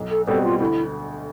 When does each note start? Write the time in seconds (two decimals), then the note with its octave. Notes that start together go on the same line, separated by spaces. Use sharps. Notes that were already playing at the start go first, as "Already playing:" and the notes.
Already playing: B1
0.10 A4
0.27 B2 G3 C4 A4
0.44 F4
0.60 D2 E4